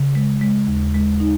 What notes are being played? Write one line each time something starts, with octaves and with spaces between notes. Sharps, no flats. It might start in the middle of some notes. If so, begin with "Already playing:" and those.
Already playing: C#3
G#3
G#3
D#2
G#3
D#4